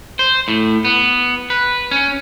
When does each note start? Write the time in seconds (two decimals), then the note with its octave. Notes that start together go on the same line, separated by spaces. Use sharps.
0.19 C5
0.48 A2
0.85 B3
1.50 B4
1.91 C#4